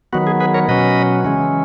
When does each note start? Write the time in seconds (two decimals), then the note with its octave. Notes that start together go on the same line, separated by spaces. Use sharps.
0.13 D#3 F#3 B3 F#4
0.27 G#4
0.40 G#4 B4
0.54 A#4 C#5
0.68 B2 F#3 C#4 B4 D#5
1.25 C#3 E3 G#3 C#4